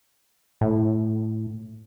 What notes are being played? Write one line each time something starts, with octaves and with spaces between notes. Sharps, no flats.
A2